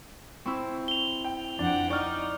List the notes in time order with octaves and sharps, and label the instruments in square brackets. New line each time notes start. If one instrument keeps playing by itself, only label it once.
[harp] C4 E4 [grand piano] C#6 E6
[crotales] F7 G7
[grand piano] G5
[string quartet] F2 F#5 G5 [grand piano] D4
[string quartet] D#4 [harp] D5 [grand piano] C#6 F6